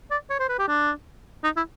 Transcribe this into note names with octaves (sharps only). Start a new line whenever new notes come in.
D5
C#5
C5
B4
G4
D4
D#4
E4